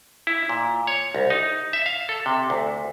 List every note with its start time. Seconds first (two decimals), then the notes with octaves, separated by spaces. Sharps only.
0.27 E4
0.49 A#2
0.87 C#5
1.15 C2
1.30 D#4
1.73 E5
1.86 F5
2.09 A4
2.26 C3
2.50 D2